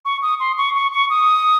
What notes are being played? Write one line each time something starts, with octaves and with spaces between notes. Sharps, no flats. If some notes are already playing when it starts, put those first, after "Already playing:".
C#6
D#6
C6
C#6
C#6
C#6
D#6